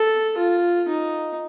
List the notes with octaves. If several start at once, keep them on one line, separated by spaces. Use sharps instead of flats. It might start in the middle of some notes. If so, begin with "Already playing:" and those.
Already playing: A4
F4
D#4